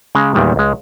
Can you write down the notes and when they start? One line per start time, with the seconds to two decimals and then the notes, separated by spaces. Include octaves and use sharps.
0.15 C#3 G#3 F5 A#5
0.34 E2 A#2 D#3 G3 G#3
0.56 C#2 G#3